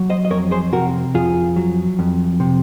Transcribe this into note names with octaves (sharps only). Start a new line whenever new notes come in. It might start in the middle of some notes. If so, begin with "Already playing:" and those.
Already playing: F#3
C5 D#5
D#5
F2 A#4 C#5
G#4 C5
C3 F#4 A#4
F2 F4 G#4
F#3
F2
C3